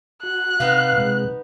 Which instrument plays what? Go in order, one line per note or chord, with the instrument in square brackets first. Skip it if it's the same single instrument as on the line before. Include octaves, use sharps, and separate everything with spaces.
[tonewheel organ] F#4 [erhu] F#6
[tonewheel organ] C3 [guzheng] B3 D#4 D#5 [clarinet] F5
[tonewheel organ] C3 G#3